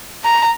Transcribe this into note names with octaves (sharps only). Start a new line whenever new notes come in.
A#5